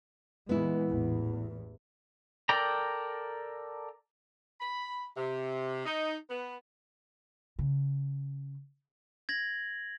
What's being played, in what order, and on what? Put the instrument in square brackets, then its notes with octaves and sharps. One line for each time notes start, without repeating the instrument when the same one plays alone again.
[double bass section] A#2 E3 G#3 [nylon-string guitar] B3 E4
[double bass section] A1 E2
[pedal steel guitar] A4 A#4 D5 G5 A#5
[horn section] B5
C3
D#4
B3
[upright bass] C#3
[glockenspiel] G#6 A#6 F#7